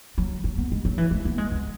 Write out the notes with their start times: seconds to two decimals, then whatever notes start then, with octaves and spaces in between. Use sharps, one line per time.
0.18 F#3
0.44 F#3
0.58 B3
0.72 G#3
0.85 F#3
0.98 E3
1.11 G#3
1.25 B3
1.38 G#3
1.51 B3